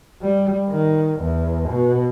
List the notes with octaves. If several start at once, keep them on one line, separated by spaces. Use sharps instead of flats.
G3
D#3
E2
B2